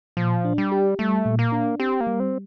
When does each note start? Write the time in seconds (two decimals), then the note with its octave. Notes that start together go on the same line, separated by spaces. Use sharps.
0.17 A#2 F3
0.45 D4
0.58 G3
0.72 G4
0.99 G3 A3
1.25 A#2
1.39 A#3
1.52 D4
1.80 C4 G4
2.00 A#3
2.07 G3
2.20 C4